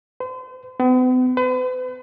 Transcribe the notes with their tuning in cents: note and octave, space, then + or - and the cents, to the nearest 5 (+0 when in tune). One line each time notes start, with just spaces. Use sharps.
C5 -40
B3 +45
B4 +45